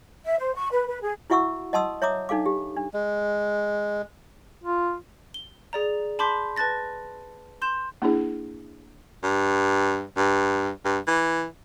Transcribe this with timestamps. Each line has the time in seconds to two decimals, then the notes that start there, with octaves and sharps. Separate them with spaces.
0.25 E5
0.39 C5
0.55 C#6
0.71 B4
0.87 B4
1.02 G#4
1.30 E4 F#4 E5 F#5 C#6 E6
1.73 D#5 F#5 A5 C6 D#6 E6
2.02 C#5 E5 A#5 D6 D#6
2.29 D4 D#4 A4 F5 D6
2.46 G4
2.77 D4
2.94 G#3
4.64 F4
5.34 G7
5.73 G#4 D5 A#5
6.19 A5 B5 C6 D6 G6 B6
6.56 B4 A5 F#6 A6 A#6
7.62 C6 G6 E7
8.02 A#3 D4 E4 G#4
9.23 G2
10.17 G2
10.85 G2
11.07 E3